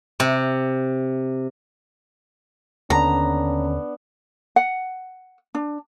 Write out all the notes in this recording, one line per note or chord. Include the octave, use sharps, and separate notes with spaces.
C3
D#2 D3 B3 C#4 D4 A#5
F#5
D4